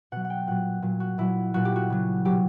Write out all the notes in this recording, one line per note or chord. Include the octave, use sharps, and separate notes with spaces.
B2 F#3 F#5
F#5
G5
A#2 F#3 F#5
A#2 F#3
F#4
A#2 F#3 E4
A#2 F#3 F#4
G4
F#4
C#3 F#3
B2 F#3 G4